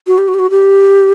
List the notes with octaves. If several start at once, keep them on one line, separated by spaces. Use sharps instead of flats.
F#4
G4
F#4
G4
F#4
G4